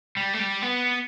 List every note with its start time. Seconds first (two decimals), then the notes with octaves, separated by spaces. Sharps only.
0.17 G3
0.33 A3
0.39 G3
0.62 B3